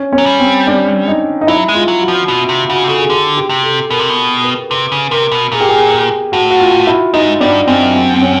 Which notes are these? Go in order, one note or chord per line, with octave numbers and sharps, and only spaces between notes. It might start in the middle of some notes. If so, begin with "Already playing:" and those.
Already playing: C#4
C#4
F#3
G3
C4
D4
D#4
D#4
F#3 E4
G#3
F4
F#3
F#4
F3
B2 F#4
C3
C#3 F#4
C3
C#3 A4
G#4
D3 G4
G4
C3
A4
B2 A#4
C3
B2
B4
C3 B4
C#3
C3 A#4
B2
A#2 G#4
G4
G#4
G#4
A2 F#4
F#4
F4
E4
G#2 D#4
G2 D4
F#2 C4
C4
C4
C#4